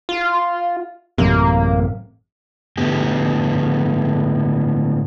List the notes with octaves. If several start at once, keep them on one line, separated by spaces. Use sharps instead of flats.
F4
A1 F#2 C3 A#3
A2 D3 B3 G4